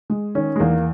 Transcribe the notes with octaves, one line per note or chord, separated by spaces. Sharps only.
G#3
D#3 C#4
G#3
E2 A#3